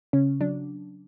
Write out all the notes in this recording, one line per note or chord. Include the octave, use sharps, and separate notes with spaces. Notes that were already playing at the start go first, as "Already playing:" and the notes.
C#3 C#4
F#3 D4